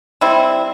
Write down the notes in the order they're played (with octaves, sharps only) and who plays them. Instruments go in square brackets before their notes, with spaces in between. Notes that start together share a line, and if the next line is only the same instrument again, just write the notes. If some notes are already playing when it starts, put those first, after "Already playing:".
[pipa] G3 C4 E4